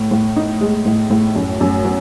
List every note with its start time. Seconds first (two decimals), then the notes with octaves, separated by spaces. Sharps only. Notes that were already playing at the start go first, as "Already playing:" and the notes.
Already playing: A2
0.11 A2
0.36 D#4
0.61 G#3
0.86 A2
1.10 A2
1.36 F#2
1.61 F#2
1.85 F#3